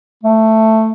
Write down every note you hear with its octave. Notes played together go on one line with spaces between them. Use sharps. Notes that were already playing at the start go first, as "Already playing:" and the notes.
A3